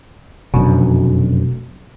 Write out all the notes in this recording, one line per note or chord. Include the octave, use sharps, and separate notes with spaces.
F1 F#2 B2 D3